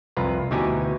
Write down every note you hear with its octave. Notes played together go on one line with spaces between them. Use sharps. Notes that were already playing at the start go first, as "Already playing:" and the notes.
C2 F2 F4 B4 A#5
D2 B2 E3 D#4 G4 G#5